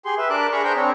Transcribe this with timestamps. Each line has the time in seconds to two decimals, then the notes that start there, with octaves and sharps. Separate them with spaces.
0.05 G4 G#4 C6
0.18 B4 E5
0.30 D4 A#4 A5 D6 F#6
0.52 G#4 A#5 B5 C#6
0.64 D4 G#4 C5 G5 A#5 G6
0.76 C4 D4 C#5